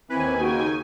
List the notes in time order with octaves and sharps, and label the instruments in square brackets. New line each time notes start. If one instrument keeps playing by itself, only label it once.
[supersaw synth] D#2 G#5 [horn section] E3 B4 [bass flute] C4
[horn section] C#3 D#4 G5 [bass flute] F#4